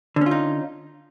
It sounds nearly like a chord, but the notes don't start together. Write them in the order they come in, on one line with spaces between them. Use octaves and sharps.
D3 C#4 F4 D#4